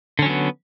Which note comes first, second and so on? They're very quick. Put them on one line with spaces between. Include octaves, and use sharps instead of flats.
D3 C#4 F#3 B3